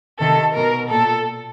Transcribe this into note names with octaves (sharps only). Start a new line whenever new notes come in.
C3 D#3 A4
B2 A#4
A#2 A4